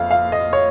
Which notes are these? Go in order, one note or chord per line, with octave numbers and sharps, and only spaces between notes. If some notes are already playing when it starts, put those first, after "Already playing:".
Already playing: F2 F5
F5
D#5
C#5